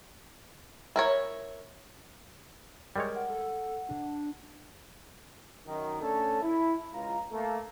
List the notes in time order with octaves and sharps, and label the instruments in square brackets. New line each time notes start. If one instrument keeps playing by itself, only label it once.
[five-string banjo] E4 A#4 C#5
[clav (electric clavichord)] G3 G#3 C#5 [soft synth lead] A#4
[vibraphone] F#5
[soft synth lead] A4
D4
[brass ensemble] F#2 D#3
A3 C#4 D4 A4
E4
C#2 F4 A#5
A3 A#3 A4